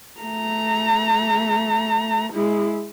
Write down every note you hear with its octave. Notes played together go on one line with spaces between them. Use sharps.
A3 A#5
G#3 E4